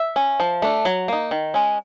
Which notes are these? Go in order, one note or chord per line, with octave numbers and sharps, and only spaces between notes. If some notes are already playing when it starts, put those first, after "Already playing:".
Already playing: E5
C#4
F3
A3 D4
F#3
A#3 D#4
D#3
G#3 C#4